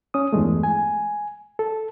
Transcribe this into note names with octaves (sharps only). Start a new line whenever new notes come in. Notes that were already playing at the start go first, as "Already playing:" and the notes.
C#4 D#6
E2 G2 G#3 A3
G#5
A4